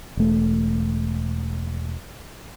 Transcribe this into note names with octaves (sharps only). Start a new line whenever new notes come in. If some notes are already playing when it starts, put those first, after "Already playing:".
E1 A3